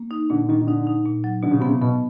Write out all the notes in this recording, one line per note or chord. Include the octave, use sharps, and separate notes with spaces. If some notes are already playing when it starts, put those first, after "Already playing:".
Already playing: A#3
D#4
A#2 D3
A#2 D#3
D#3
D3 D#4
D#4
A#2
F#3
B2 D3
C#3
C3 B3
C#3
B2 B3